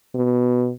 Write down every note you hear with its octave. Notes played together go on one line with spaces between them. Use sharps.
B2